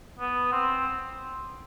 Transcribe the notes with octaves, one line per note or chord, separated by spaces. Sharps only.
B3
C4